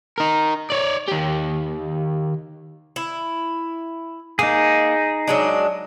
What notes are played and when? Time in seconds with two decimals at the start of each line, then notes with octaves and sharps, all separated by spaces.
0.18 D#4 A#4
0.70 C#5 D5
1.08 D#3 G4
2.96 E4
4.39 A#3 D#4 G#4
5.28 F#3 G#3 D4